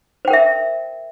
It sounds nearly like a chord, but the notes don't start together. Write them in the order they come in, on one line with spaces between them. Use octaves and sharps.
C5 G5 A#4 E5